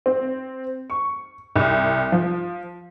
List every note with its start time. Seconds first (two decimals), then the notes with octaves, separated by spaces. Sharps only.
0.06 C4
0.90 C#6
1.56 C2
2.12 F3